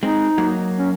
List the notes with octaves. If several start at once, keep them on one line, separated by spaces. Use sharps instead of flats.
G#3 C4 D#4
F#3 A#3
C#4